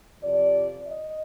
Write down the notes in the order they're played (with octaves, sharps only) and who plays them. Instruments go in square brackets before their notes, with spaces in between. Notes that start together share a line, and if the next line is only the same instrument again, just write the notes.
[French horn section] F2 C3 F3 D5
D#5